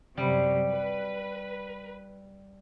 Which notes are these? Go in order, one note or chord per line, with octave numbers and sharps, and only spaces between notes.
F#2 C3 F#3 G3
B4